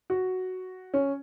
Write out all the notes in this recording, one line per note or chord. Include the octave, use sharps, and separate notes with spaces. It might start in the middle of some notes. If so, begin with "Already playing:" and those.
F#4
C#4